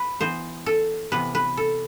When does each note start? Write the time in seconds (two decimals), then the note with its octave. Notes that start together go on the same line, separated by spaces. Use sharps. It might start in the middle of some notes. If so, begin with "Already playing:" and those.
Already playing: B4
0.21 E3 B3 C5
0.66 A4
1.12 C3 E3 B3 B4
1.35 B4
1.57 A4